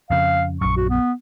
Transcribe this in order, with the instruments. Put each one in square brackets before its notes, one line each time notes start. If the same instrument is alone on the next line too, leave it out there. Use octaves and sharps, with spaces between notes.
[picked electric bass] F2 C#3 [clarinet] F5
[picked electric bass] A#1 F#2 [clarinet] C#6
[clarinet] F#4
B3